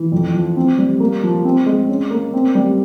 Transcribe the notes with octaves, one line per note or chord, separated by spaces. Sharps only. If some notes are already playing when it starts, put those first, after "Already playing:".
Already playing: E3
F2
F3
C4
G3
A#3
F3
C4
G#3
C#4
A#3
C4
G3